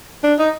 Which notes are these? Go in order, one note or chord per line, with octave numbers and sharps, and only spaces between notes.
D4
D#4